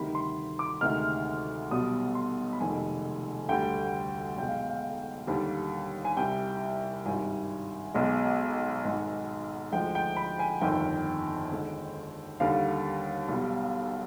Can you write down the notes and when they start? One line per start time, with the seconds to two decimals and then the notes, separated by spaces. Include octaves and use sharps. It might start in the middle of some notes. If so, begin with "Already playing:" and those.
Already playing: D2 C3 D#3 G3 B5
0.15 C6
0.59 D6
0.81 D2 C3 D#3 G#3 F6
1.71 B1 B2 G3 D#6
2.15 C6
2.53 B5
2.60 F1 F2 D#3 G#3 G#5
3.49 D2 D3 G3 G5
4.38 B1 B2 G#3 G5
4.48 F5
4.69 F5
5.27 D#2 D3 G3
6.05 G#5
6.17 C2 C3 G3 G5
7.06 G#1 G2 D#3 G3 G#5
7.94 B1 B2 G#3
8.84 G#1 G#2 D#3 G#3
9.72 D2 D3 F3 G#3 G5
9.95 G5
10.17 B5
10.39 G#5
10.61 G1 F2 D#3 G5
11.51 D#2 D3 G#3
12.40 D#2 D3 G3 F5
13.28 B1 B2 G3